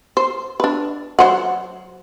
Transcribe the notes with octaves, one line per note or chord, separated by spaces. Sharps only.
C5
D4 B4
F#3 C5 F#5